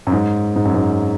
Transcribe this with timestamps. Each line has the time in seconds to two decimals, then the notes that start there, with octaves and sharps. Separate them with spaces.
0.07 F#2
0.12 G#2
0.56 G#2
0.65 F#2
0.74 G#2